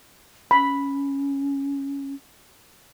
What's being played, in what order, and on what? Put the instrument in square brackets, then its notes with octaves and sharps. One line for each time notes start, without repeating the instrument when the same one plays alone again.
[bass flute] C#4 [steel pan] B5